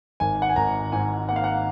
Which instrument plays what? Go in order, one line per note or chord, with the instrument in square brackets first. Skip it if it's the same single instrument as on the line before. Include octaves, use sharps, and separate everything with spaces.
[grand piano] G#1 G#5
F#5
G#5
G#1 A#5
G#2 G#5
A#3 F#5
F5
F#5